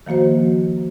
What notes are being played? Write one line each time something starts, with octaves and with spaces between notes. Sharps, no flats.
D#3 F3 A#3 F#4 C5